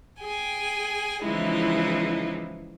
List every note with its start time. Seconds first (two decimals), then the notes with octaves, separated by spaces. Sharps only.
0.21 G#4 G5 G#5
1.25 C#3 E3 F3 G#3 D#4 E4